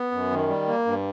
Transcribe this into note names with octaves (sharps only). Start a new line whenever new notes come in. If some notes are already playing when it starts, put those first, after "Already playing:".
Already playing: B3
F#2
D#3
G3
A#3
G2